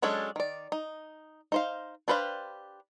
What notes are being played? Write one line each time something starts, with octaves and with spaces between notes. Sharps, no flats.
F#3 G#3 C#4 D4 A4
D#3 D5
D#4
D#4 C5 F5
D4 G4 B4 C5 F5